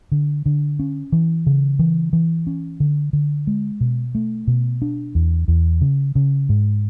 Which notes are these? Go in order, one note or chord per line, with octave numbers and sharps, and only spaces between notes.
D3
D3
C#4
E3
C#3
E3
E3
C#4
D3
D3
G#3
B2
A3
B2
D4
E2
E2
C#3
C#3
G#2